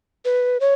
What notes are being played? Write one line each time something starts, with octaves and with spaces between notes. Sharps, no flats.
B4
C#5